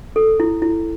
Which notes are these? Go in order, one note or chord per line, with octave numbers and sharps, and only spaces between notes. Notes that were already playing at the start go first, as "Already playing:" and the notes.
A4
E4
E4